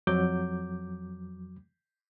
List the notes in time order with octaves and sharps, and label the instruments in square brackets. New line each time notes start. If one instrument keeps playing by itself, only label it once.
[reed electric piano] F2 F#3 D6 G6